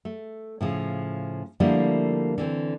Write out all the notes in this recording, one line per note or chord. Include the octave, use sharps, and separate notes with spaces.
A3
A2 C#3 F3
D3 F3 G3 A3 A#3 E4
D3 E3 C4